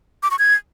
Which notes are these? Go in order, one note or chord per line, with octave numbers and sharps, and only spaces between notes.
D6
C#6
G#6